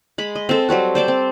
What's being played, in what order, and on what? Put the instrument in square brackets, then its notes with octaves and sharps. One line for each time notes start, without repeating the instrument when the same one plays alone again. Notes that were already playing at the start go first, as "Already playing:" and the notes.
[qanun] G#3 B5
D#5
C4 A4
F#3 G3 C4 F#4
C5 D5 G5 A5
C4